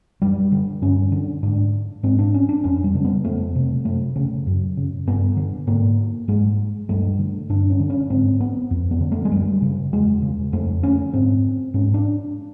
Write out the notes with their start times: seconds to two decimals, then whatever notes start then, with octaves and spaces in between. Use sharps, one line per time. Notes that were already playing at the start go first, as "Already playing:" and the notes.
0.22 F#2 G3
0.52 D3
0.82 G2 C#4
1.12 D3
1.43 G#2 D4
2.03 G#2 C4
2.19 D4
2.34 C#4
2.49 D4
2.64 F2 C#4
2.84 G3
2.94 C#3
3.05 B3
3.25 F2 A3
3.55 C3
3.85 F#2 A3
4.16 C#3
4.47 F#2
4.77 C#3
5.07 G2 B3
5.37 D3
5.67 G#2 A#3
6.28 G#2 G#3
6.89 G2 A3
7.19 D3
7.49 G2 D4
7.70 C#4
7.80 D3
7.90 C#4
8.10 G#2 C4
8.40 B3
8.71 F2
8.91 B3
9.01 D3
9.12 A3
9.25 G#3
9.32 F#2 G3
9.62 C#3
9.92 E2 G#3
10.22 C#3
10.53 F2 A3
10.83 D3 C#4
11.13 G#2 C4
11.74 G#2 C#4
11.94 D4